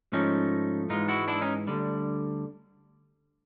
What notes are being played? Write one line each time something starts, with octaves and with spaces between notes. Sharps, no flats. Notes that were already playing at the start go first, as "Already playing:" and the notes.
G#2 F3 A3 C#4 D#4
G#2 E3 G#3 D#4 F4
E4 F#4
D4 E4
C#4 D#4
D2 D3 G3